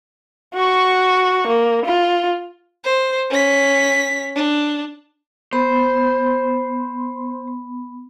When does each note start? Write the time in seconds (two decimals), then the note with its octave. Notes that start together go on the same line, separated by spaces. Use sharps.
0.55 F#4 C#6
1.47 A#3
1.86 F4
2.84 C5
3.30 C#4 B6
4.35 D4
5.53 B3 C5 B5